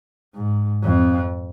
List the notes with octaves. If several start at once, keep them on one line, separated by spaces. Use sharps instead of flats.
G#2
F2